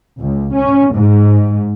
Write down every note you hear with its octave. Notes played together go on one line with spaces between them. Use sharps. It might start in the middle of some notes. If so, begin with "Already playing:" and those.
C#2
C#4
G#2